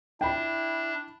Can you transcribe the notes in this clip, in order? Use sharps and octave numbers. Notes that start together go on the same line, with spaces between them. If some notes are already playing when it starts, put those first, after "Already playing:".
D4 E4 G5 B5